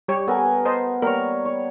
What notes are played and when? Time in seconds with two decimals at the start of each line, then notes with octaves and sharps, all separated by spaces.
0.08 G3 G4 C#5
0.28 B3 A4 A#4 G#5
0.65 C5 D#5 A5
1.02 G3 A#3 A#4 C#5
1.45 C#5